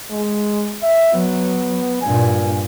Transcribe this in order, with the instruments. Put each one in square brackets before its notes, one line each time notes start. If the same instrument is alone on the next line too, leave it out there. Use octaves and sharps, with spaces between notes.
[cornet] G#3
E5
[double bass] F#3 [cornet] B3
[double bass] G2 A#2 [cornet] G#5